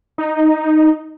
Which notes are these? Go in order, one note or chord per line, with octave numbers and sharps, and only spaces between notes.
D#4